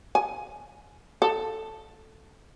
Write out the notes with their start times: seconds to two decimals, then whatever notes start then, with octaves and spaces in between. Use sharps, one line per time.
0.15 G#5
1.22 A4